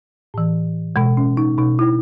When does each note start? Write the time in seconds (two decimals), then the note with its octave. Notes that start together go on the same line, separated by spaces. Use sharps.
0.34 A2 E3
0.96 B2 G#3
1.17 C#4
1.37 D#4
1.58 B2 D#4
1.79 E4